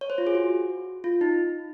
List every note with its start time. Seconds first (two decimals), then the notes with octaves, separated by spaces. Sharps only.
0.01 C#5
0.10 C5
0.18 F4
0.27 G#4
0.35 F#4
1.04 F4
1.21 D#4